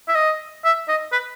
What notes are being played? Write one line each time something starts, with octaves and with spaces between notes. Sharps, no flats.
E5
D#5
E5
D#5
B4